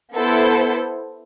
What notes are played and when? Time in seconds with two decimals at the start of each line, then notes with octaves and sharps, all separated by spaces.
0.14 B3 E4 A4 C5